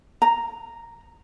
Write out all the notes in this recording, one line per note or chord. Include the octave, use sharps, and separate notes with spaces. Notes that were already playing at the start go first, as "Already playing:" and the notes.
A#5